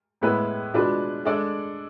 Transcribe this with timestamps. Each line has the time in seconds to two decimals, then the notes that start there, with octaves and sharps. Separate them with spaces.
0.21 A2 G#3 B3 E4 B4
0.74 B2 G#3 D4 F4 B4
1.25 G#3 D4 A4 D5